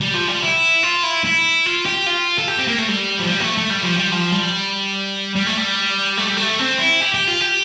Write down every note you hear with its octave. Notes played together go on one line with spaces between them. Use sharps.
G3
F3
G3
E4
F4
E4
E4
F4
G4
F4
A4
G4
C4
A#3
A3
G3
F3
G3
A#3
A3
A3
G3
F3
G3
F3
G3
G3
A3
G3
A3
G3
A3
C4
E4
G4
G4
F4
G4